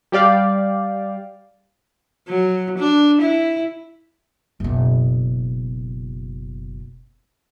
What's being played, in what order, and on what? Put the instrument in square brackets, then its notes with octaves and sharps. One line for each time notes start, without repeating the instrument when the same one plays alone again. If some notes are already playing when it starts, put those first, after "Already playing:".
[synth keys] G3 G4 D5 F5
[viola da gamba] F#3
D4
E4
[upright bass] F#1 B2